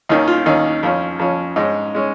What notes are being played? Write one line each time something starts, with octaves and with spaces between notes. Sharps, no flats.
D#2 D#3 C#4 D#4
F4
D#2 D#3 C#4 D#4
F2 F3 C#4
F2 F3 C#4
G#2 G#3 C#4 D#4
G#3 C#4